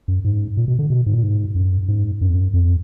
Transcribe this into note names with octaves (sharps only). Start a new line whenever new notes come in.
F#2
G#2
A#2
B2
D3
B2
G#2
A#2
G#2
F#2
G#2
F#2
F2
F#2
F2